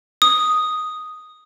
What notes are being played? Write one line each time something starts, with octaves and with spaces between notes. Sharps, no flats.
D#6